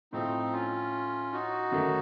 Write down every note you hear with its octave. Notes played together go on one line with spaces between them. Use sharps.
A2 F3 A3 C4 D#4
C#4 F4
D#4 F#4
F#2 D#3 A3